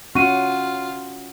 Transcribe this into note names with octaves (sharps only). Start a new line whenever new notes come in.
C#4 F4 F#4 C#6 D#7